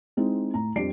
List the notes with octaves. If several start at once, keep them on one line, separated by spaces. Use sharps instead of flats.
G#3 C4 D#4 E4
A2 A#5
F2 G3 D4 D5 C7 D7